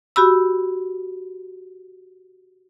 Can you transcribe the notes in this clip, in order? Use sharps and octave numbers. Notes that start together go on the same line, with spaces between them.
F#4 G4 B5 E6